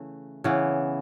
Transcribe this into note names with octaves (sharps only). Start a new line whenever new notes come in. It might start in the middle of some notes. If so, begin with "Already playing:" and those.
Already playing: C#3 E3 A3
C#3 E3 B3